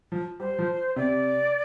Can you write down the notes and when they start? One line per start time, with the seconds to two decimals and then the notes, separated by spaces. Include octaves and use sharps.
0.12 F3
0.40 G3 C5
0.59 F3
0.96 C3 D5